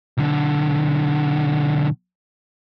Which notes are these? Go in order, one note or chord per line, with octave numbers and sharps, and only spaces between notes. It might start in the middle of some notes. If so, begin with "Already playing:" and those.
B1 D3